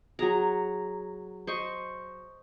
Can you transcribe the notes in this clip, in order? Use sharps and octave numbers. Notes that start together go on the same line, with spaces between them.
F#3 G#4 A#5
C5 D#5 C#6